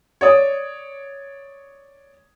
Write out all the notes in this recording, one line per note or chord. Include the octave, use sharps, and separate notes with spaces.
C#5 D5 D#6